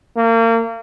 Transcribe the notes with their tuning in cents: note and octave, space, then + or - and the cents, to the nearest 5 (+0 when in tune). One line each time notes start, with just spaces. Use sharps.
A#3 -30